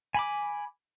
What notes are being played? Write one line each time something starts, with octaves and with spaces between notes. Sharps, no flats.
G#5 B5 D6